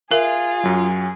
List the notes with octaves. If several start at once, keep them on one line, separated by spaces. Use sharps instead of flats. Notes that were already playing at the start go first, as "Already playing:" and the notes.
F4 G#4 A#4 E5
F#2 F#3